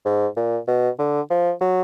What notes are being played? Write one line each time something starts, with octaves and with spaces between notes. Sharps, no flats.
G#2
A#2
B2
D3
F3
F#3